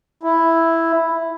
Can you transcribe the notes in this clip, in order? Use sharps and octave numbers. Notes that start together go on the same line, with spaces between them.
E4